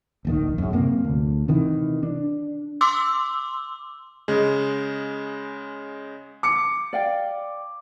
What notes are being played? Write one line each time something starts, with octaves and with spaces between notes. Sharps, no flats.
D1 A#1 D#3
F#2 C#3
F#2 C3 A#3
D2
C3 D#3 E3
D4
C6 D6 E6
C#3 G#3
D6 C#7
D5 F5 G5